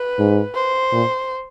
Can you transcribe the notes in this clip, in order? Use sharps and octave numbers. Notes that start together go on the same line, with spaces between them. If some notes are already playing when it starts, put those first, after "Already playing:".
Already playing: B4
G#2
C5
A#2